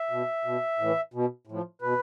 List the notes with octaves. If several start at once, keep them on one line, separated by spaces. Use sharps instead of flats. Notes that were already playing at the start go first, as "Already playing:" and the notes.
Already playing: E5
B2
B2
A2 E3
B2
A2 F3
B2 B4